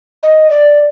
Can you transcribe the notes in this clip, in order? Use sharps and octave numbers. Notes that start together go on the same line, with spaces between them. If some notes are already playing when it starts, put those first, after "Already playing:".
D#5
D5